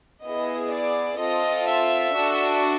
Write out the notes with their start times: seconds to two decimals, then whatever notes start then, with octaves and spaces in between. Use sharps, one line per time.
0.23 B3 E4 G#4 D#5
0.72 D5
1.19 C4 F4 A4 D#5
1.67 E5
2.14 D4 F#4 A4